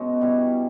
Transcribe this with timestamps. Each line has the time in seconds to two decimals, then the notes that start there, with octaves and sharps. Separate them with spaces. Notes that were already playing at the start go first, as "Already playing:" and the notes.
Already playing: B2 G#3 C#4 D#4
0.21 G3 B3 E4